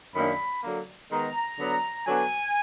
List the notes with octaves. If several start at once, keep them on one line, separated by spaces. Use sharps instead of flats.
F#2 D#3 A#3 D4 B5
D3 F#3 A#3
D#3 G#3 B3 A#5
D3 F#3 B3 D4
D3 F#3 B3 D4 G#5